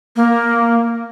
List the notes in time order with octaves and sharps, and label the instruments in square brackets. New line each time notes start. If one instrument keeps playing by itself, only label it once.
[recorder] A#3